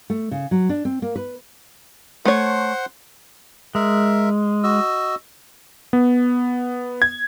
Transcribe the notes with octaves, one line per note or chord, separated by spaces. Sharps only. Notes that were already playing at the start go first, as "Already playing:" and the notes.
A3
C#3
F#3
D4
C4
A#3
B4
A3 C5 C#5 F#5 C6
G#3 A#4 E5
F#4 D#5 E6
B3
G#6